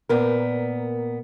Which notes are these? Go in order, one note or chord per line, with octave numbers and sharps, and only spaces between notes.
A#2 B3 A#4